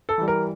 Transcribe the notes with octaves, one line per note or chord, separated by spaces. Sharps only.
A4
E3 G3
A#4